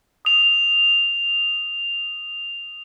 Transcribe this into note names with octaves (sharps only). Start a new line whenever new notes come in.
D#6 F7